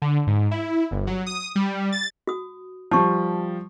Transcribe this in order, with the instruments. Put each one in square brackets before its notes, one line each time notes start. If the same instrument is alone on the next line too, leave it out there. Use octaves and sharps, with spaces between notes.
[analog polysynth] D3
G#2
E4
G1
F#3
D#6
G3
A6
[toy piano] F#4 D#6
[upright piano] F3 G3 [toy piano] A5 C#6